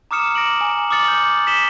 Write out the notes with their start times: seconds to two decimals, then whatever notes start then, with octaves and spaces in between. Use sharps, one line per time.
0.11 A#5 D6 D#6 F6 C#7 E7
0.35 A#6 D7 F#7
0.58 G#5 A#5
0.90 D6 D#6 F6 A6 C#7 F#7
1.08 G6
1.47 B6 E7 G7